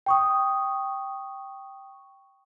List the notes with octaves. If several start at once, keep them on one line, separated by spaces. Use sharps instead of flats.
G5 C#6 D#6